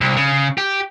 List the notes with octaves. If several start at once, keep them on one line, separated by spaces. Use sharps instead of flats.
C2
C#3
G4